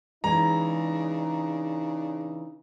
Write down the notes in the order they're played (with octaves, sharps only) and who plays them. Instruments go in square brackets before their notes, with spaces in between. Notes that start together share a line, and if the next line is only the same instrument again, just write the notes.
[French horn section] C#3 D4 D#4 [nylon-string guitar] E3 G#3 [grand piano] A#5